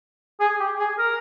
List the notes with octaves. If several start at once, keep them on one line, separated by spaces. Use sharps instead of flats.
G#4
G4
G#4
A#4